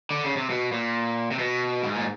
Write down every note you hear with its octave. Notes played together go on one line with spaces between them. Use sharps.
D3
C#3
C3
B2
A#2
C3
B2
G#2
A#2